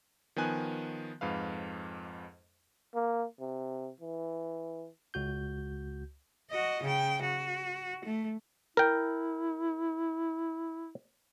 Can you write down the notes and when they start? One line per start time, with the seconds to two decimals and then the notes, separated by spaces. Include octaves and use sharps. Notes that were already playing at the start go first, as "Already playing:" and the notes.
0.36 D#3 F3 B3 G#5 F#6
1.21 F2 G#2 B4 F5
2.94 A#3
3.40 C3
4.00 E3
5.14 C#2 F#4 G6
6.51 F#4 D#5
6.83 C#3 G5
7.22 F#4
8.05 A3
8.77 E4 A#4 G5